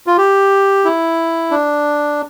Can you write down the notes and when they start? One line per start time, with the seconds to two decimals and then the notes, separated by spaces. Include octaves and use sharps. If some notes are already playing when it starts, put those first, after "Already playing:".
0.07 F4
0.18 G4
0.85 E4
1.51 D4